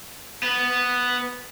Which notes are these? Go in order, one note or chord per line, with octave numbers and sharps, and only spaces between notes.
B3